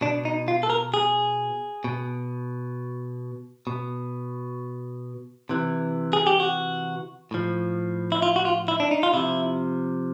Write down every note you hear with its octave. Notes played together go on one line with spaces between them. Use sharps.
B2 D4
D#4
F4
A4
A#4
G#4
B2
B2
C3 E3
G#4
G4
F#4
A2 F3
E4
F4
F#4
F4
E4
D4
D#4
F4
C3 F3 E4